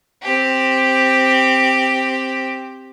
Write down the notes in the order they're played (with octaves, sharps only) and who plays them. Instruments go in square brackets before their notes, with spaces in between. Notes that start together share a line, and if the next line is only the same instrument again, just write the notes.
[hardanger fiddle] C4 G4